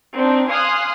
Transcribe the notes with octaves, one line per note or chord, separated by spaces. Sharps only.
C4 D4 D#4
F5 G#5 C6 D#6 F6 F#6